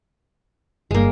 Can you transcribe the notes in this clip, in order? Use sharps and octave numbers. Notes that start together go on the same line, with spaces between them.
G1 G2 G#3 A#3